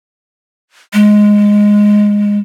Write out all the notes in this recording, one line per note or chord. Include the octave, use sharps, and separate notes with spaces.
G#3